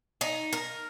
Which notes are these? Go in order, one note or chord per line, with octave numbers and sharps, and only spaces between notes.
D#4
A#4